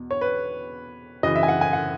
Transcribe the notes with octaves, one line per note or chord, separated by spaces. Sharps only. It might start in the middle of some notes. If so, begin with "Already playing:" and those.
Already playing: E2 B2
C#5
B4
F#2 C#3 E3 D#5
E5
G#5
F#5
G#5
F#5